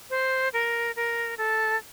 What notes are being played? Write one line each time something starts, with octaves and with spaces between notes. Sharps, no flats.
C5
A#4
A#4
A4